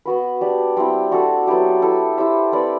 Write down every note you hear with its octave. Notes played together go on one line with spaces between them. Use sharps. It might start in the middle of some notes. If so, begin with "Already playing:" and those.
B3 F#4 B4
D4 G4 D5
G3 C4 E4 G4
D4 F#4 A4
F#3 B3 E4 G4
E4 A4 E5
E4 G4 C5 E5
C4 E4 B4 D5